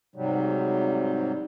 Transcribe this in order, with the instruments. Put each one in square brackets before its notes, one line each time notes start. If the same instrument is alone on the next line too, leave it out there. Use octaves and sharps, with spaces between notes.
[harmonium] G#2 C3 F#3 G3